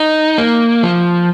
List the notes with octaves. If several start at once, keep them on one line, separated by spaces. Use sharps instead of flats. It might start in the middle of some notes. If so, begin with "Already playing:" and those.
Already playing: D#4
A#3
F3